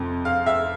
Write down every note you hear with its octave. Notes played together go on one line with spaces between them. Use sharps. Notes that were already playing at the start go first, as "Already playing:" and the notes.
Already playing: F2 C3
F5
E5